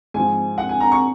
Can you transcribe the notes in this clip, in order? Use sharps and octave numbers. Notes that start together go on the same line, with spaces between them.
G#2 F3 G#5
F#5
G#5
A#5
C#6